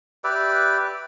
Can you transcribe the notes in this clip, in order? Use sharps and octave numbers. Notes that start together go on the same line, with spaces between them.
G4 B4 D5 E5